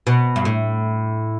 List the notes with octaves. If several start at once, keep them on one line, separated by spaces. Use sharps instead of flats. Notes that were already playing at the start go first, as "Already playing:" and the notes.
B2
G2
A2